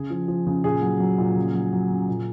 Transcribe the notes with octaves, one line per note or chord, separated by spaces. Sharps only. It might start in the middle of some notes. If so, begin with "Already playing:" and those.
Already playing: C#3 G#4
F3
F3
C#3
A#2 G#4
F#3
F#3
A#2
C#3
F#3
F#3
C#3
A#2